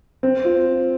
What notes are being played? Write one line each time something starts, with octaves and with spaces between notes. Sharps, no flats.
C4
F4